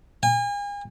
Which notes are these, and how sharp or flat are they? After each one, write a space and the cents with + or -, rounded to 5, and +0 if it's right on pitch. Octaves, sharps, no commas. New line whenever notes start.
G#5 -40